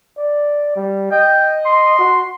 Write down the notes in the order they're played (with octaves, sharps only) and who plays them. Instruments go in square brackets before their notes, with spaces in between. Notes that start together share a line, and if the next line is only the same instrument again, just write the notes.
[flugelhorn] D5
G3
[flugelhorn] D#5 [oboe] G5
[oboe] C6
[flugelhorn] F#4